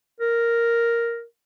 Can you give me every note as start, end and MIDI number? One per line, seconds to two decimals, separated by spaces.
0.20 1.23 70